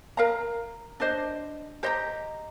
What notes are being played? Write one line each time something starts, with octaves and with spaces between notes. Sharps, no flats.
A#4 F5 A#5
D4 G4 C5 D#5
G4 C5 D#5 A#5